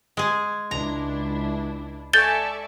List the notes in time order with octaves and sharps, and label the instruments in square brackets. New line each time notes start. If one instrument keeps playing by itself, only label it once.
[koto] G#3 G#4
[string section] C#2 D4 E4 [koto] A#5
[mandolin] A4 G#5 [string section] D5 E5 C#6 [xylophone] G6 A6 G7